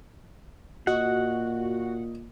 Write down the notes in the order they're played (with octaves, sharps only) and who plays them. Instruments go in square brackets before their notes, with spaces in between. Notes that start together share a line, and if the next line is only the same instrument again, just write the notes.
[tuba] A#2 [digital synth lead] F#4 [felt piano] D#5 [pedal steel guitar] F#5